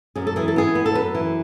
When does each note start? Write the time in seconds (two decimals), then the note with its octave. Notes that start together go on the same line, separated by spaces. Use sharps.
0.16 F#2 G#4
0.27 A4
0.36 E3 G#4
0.48 A4
0.56 B3 G#4
0.75 B3
0.86 A4
0.95 F#2 B4
1.15 E3